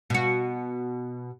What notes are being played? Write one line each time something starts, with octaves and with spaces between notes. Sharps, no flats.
B2 F#4